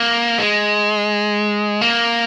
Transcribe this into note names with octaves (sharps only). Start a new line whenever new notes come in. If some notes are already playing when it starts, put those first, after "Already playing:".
Already playing: A#3
G#3
A#3